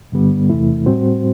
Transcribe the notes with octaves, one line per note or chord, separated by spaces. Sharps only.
G2 D3 G3 B3
E2 C3 E3 A3 E4
A2 G3 C4 F#4 C5